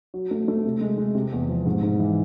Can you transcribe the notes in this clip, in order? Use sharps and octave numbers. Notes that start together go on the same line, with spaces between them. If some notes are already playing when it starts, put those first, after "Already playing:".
F#3
A3
A3
C3
G#3
G#3
C3
E2
F3
G#2
G#2
E3